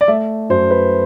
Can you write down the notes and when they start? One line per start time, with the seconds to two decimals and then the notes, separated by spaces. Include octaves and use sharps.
0.01 D5
0.08 A3 E5
0.49 F#2 C5
0.71 B4